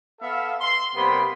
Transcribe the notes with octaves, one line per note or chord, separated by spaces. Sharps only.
B3 A4 E5 F5
C6
C3 G3 A#3 B3 B5 C6